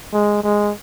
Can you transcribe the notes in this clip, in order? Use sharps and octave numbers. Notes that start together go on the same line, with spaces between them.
G#3
G#3